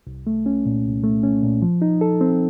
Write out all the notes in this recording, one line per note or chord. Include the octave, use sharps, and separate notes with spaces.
C2
A3
C#4
A#2
C2
A3
C#4
A#2
F3
D#4
A4
C4